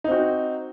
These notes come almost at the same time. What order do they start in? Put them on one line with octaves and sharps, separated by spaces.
D#4 C4 F#4